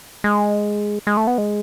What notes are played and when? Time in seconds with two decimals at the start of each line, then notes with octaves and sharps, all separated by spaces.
0.24 G#3
1.07 G#3
1.17 A3
1.27 B3
1.38 G#3